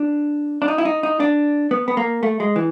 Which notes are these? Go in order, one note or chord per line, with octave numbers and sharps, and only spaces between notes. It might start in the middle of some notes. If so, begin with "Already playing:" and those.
Already playing: D4
D4
D#4
E4
D#4
D#4
D4
B3
B3
A#3
A3
G#3
E3